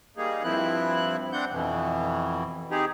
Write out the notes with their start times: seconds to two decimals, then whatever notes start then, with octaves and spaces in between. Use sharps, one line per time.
0.17 G3 A#3 D#4 G#4
0.44 G2 F3 C4 E4 F#6
1.33 C4 D4 F#5 G6
1.51 F2 B2 E3
2.71 C4 D#4 G4 G#4